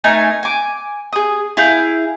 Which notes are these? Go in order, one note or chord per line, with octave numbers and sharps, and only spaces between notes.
A3 D#4 A#4 G#5
G#5 D6
G#4 D#6
E4 G#4 F5 G6